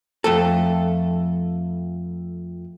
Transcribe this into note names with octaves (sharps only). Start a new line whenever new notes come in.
F2 A3 A4